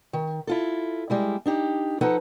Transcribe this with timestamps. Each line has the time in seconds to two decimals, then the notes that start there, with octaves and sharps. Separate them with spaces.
0.13 D#3
0.47 E4 F4 A4
1.10 G3 G#3 E4
1.46 D4 D#4 G4
2.01 F3 D#4 A4 B4 F#5 A5